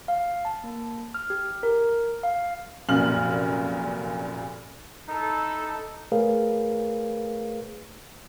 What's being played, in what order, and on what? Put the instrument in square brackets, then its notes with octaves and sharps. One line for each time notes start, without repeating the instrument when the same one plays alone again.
[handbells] F5
A5
A#3
F6
G4
A#4
F5
[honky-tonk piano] F1 F#2 A#2 F6 F#7
[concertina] D#4 [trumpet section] E4 A4
[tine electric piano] A3 G#4 A#4 B4 C#5 F5